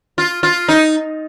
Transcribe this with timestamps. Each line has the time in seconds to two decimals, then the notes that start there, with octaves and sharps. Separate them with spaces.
0.18 F4
0.43 F4
0.68 D#4